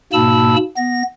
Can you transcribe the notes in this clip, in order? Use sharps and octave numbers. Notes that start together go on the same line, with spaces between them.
G#2 B2 A#3 A5 B5 E6
B3 A#6